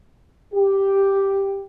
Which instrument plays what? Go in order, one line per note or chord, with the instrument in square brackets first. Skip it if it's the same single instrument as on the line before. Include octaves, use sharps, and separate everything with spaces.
[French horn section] G4